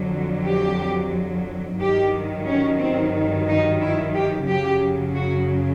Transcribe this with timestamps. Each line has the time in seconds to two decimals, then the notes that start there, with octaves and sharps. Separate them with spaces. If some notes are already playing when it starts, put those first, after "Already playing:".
Already playing: F2 D3 F#3
0.44 G4
1.78 G2 D#3 F#3 G4
2.46 C#4
2.79 C4
3.47 D#4
3.80 E4
4.14 G4
4.48 F#2 C#3 F#3 G4
5.15 F#4